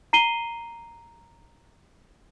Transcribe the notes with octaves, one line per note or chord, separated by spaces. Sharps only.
A#5 C7 D#7 G7